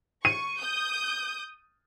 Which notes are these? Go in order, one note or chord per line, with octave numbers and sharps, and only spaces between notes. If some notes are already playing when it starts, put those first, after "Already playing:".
C#6 D#7
D#6 G6